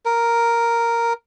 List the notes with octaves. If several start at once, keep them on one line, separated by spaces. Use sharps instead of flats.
A#4